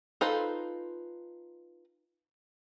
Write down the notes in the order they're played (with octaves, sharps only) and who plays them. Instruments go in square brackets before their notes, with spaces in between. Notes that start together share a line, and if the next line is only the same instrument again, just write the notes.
[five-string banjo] D#4 F4 A4 B4 C5